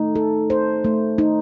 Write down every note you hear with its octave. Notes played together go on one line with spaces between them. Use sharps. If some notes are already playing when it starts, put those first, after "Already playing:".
Already playing: A3 D#4
A4
C5
A3
D#4